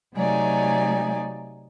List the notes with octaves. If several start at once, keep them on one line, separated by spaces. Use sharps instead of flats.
C3 F#3 A3 D#4 D5 G#5